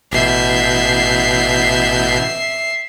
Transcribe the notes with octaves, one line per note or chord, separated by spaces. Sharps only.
A1 B2 E5 G6 C7